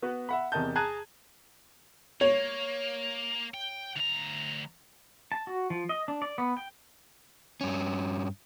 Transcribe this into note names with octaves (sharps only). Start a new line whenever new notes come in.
B3 F#4 B4
E5 F#5 B5
E2 C3 A#4 D#5 A5 G6
G#4 A5 A#5 F#6 G#6 D#7
A#3 C#5
G5
D2 A#5
A5
F#4
F3
D#5
D4
D5
B3
G5
G2 C#4